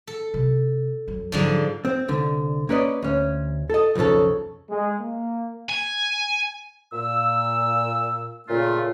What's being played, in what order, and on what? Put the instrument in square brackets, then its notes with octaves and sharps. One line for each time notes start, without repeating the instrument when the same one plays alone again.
[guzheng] A4
[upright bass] C3
F#2
[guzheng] G#2 D3 F3 [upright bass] F#3
[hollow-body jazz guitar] C4
C2 D3
A#3 C#4 B4 D5 D#5
D2 C#4
A4 D#5
B1 F2 A#2 C#3 A4
[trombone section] G#3
A#3
[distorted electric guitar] G#5
[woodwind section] A#2 E6
A#2 C#3 A3 F4